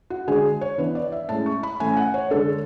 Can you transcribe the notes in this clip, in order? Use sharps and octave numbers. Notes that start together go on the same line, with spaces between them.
F#4
D3 G#3 D4 G#4
C#5
E3 B3 D4 B4
D5
E5
A2 G#3 C#4 A5
C#6
B5
A2 E3 A3 C#4 G#5
F#5
C#5
D3 G#3 D4 A4